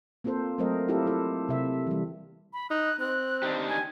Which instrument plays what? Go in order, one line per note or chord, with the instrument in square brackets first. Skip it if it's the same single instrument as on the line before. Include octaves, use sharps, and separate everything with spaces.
[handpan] A#3 C4 F4 A4 C5
F#3 A3 C4 A#4 C5 D#5
C4 E4 F4 G4 A4 A#4
E4 A4
C3 E5
E3 G3
[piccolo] B5
[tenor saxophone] D#4 [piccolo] F#6
[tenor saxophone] C4 [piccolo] F#6
[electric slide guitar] D4 D#4 G4
[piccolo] G#5